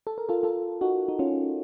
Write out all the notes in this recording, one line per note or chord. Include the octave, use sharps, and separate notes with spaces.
A4
A#4
F4 A4
F4 A4
D#4 F#4
D#4
C#4 F4